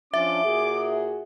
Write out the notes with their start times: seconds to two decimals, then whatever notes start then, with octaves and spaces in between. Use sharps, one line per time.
0.14 F3 C#4 D4 E5 D6
0.44 A#2 F#4 G#4